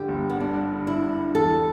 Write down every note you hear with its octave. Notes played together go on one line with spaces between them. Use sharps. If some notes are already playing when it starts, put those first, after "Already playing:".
Already playing: G2 D3 G4
G1
B3
G2 D4
D3
E4
G2
E2 A4